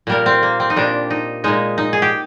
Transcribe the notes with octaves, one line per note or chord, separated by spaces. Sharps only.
A#2 G3 A#4
C4
A#3
C4
D#4
A#2 G3 D4
D#4
A#2 G#3 D#4
D#4
G#4
G4